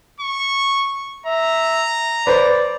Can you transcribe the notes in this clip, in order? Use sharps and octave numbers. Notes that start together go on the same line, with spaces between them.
C#6
E5 A#5
B4 C5 D5